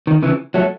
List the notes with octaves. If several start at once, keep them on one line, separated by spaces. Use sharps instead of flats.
D#3
C#3 E3
F#3 A3